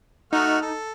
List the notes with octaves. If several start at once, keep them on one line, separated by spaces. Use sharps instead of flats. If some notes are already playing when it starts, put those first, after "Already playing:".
A3 D#4 F#4 F6
A4